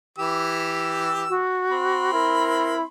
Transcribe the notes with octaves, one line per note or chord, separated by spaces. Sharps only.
E3 G4 E6
F#4
C4 B5 C6
E4 A#4